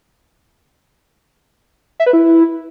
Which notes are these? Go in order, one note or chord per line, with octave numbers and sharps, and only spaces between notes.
E5
B4
E4